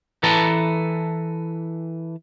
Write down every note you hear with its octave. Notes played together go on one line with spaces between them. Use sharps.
E3 A4 B4 A5 A#5